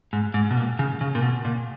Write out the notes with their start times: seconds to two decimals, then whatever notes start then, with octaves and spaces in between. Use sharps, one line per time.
0.13 G#2
0.34 G#2
0.51 B2
0.57 A#2
0.79 C#3
1.01 C#3
1.15 A#2
1.22 B2
1.45 A#2